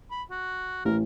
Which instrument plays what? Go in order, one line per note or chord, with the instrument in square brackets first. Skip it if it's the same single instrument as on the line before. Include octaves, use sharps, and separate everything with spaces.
[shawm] B5
F#4
[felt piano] A1 [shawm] A#4